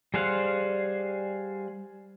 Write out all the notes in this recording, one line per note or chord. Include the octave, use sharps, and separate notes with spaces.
G3 G#4 C5 F5 F#5